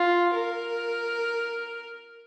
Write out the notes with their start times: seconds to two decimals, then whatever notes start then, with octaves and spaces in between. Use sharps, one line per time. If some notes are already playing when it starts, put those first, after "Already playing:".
Already playing: F4
0.35 A#4